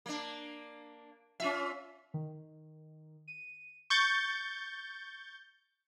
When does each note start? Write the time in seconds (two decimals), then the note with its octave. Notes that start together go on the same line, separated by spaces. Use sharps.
0.06 A#3 D4
1.40 C#4 F4 E5
2.14 D#3
3.28 D#7
3.90 C#6 G6 A6